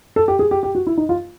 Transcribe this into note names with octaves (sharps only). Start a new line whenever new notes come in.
A4
G4
G#4
G4
G4
F#4
E4
D#4
F4